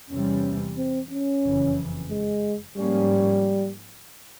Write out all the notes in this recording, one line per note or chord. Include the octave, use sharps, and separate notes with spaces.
E2 C3 E3 G3 C#4
C4
C#4
F#1 F2 C#3 E3
G#3
G#2 F3 G3 A#3 C#4